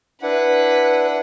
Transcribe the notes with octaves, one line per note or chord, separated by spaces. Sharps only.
D4 E4 B4 F#5